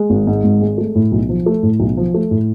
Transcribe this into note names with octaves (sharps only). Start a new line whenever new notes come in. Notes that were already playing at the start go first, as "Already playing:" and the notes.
Already playing: G#3
G#1
G#2
G#1
G#3
A3
A2
B1
F3
A3
A2
B1
F3
A3
A2